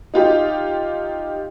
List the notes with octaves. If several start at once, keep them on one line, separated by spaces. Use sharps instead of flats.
D#4 F4 G4